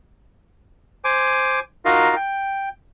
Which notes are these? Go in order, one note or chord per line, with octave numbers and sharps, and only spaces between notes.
C5 G#5 D6
D#4 F4 F#4 A#4 D#5 F5
G5